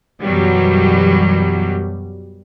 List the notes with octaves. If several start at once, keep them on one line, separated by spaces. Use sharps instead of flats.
F#2 B2 E3 F#3 G3